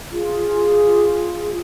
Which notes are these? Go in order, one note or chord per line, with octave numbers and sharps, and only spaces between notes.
F4 G#4